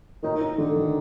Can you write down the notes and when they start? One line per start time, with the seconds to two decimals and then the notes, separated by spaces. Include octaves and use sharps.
0.23 D#3 D#4
0.41 D#4
0.58 D3 D#3
0.76 D#3